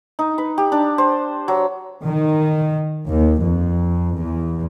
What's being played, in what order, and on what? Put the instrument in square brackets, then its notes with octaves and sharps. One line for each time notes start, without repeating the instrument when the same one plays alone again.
[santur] D#4
B4
G4
D4
C5
F#3
[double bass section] D#3
D#2
F2
E2